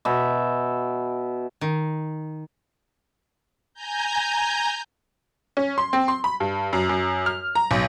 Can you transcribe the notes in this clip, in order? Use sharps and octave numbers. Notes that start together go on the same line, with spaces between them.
B2 E5
D#3
G#5 A#5 G6
C#4
C6
C4
C6
B5
G2
F#2
F#2
F6
A#5
B1